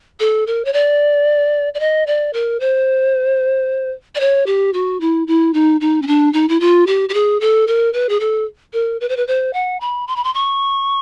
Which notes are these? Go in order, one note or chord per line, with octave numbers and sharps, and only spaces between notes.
A4
A#4
C#5
D5
D5
D#5
D5
A#4
C5
D5
C#5
G4
F#4
E4
E4
D#4
D#4
C#4
D4
D#4
E4
F4
G4
G4
G#4
A4
A#4
B4
G#4
A4
A#4
B4
C5
B4
C5
F#5
B5
C6
B5
C6
C#6